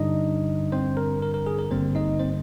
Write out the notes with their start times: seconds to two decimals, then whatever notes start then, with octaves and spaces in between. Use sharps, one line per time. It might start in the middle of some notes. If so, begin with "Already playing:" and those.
Already playing: G2 D3 G3 D4 D#4 D#5
0.72 C4 C5
0.97 A#4
1.22 A#4
1.34 A#4
1.47 G#4
1.59 A#4
1.71 G#1 G2 D3 G3 A#3 C4 C5
1.95 D#4 D#5
2.19 C4 C5